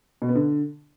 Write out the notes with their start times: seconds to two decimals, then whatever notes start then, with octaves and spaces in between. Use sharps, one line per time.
0.22 B2
0.29 B3
0.35 D3